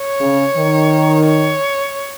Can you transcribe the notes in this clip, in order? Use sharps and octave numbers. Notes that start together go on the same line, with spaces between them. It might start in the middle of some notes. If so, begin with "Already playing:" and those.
Already playing: C#5
C#3
D#3
C#5